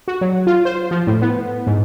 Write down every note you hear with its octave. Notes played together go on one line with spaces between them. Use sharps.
F#4
F#3
F4
C5
F3
A2
B3
G#2